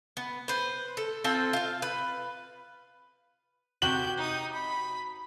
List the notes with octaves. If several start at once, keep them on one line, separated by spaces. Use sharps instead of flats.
B3
B4 C5
A4
C4 F4 A4 C5
F4 F5
B4
C3 F#4 G5 G6 F#7
D#4 D#6
B5